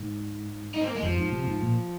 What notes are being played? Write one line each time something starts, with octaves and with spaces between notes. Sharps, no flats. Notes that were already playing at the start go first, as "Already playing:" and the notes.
Already playing: G#2
D#4
C4
A#3
G#3
F2 F3
G#2
C3
G#2
A#2